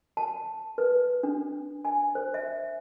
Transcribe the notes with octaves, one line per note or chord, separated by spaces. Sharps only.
A5
B4
D4
G#5
C5
E5